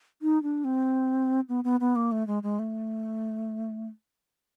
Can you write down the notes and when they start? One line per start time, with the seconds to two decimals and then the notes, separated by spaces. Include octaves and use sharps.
0.22 D#4
0.43 D4
0.64 C4
1.49 B3
1.64 B3
1.80 B3
1.96 A#3
2.12 A3
2.27 G#3
2.43 G#3
2.59 A3